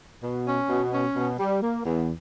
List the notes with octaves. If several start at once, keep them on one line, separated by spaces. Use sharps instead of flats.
B2
C#4
B2
C#4
B2
G3
A#3
E2